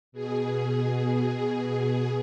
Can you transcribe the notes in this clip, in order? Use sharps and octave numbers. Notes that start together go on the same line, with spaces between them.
B2 G#4